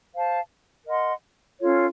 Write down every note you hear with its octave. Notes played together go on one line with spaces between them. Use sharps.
C5 F5 A5
A#4 D#5 F#5 C6
C#4 F4 A4 C#5